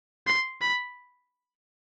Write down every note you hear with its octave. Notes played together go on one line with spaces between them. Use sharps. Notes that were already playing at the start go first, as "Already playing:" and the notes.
C6
B5